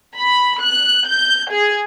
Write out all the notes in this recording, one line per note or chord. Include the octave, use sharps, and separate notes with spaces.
B5
F#6
G6
G#4